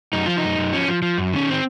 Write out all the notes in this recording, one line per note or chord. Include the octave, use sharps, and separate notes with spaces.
F#2 D#4
F3 F4
D#4
F#2
F#2
F3 C#4
F3
F3
F#2
D#3 C#4
C4